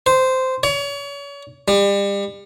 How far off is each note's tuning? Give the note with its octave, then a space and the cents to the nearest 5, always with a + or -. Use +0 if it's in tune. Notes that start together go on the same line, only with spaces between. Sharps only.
C5 -10
C#5 +35
G3 +35